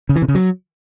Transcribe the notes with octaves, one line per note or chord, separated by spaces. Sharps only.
C#3
E3
C3
C#3
F#3